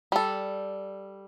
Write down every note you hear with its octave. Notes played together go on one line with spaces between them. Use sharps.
G3 A4